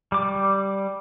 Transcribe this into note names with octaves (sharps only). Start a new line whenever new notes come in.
G3 D6